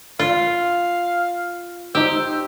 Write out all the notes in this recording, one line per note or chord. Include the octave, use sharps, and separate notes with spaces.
F4 F5
D#4 G4 C5 E6